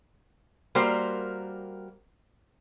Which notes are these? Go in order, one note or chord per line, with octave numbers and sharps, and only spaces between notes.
G3 A#3 F#4 A#4 C5